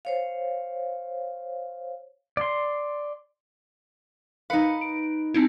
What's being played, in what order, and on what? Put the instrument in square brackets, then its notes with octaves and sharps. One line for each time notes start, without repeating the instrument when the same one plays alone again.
[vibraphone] C5 C#5 F5
[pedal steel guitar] D5 C6
[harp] D#4 B4 [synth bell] F5 C#7
[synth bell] D7
C4 D#4 E4